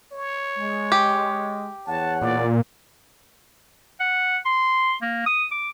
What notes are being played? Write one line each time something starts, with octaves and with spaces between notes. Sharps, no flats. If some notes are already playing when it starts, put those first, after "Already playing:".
C#5
G#3
G4
E2 C#5 F#5 A5
A#2 D5
F#5
C6
A#3
D#6
D6